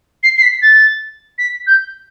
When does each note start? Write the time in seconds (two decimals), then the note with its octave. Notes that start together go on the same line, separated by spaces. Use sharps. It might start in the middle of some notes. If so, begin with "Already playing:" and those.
0.23 C7
0.37 C7
0.42 B6
0.62 A6
1.38 B6
1.67 G6